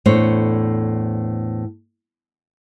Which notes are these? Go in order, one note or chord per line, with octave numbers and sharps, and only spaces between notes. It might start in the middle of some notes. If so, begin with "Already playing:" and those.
E2 A2 A3 D4 C5 C#5